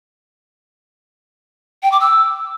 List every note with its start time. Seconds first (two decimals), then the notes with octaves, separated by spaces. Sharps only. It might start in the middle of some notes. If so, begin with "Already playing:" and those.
1.83 G5
1.92 D6
2.01 E6